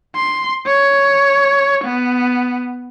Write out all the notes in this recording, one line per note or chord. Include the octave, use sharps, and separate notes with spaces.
C6
C#5
B3